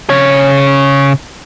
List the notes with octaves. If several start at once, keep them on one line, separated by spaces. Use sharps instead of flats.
C#3 C#5